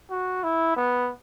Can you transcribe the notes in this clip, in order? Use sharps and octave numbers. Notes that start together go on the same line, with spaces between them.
F#4
E4
B3